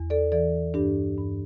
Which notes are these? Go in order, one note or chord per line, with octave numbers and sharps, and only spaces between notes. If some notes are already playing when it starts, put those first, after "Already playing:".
Already playing: E2
A4 D5
E3 A4 D5
G2 D4 G4
G2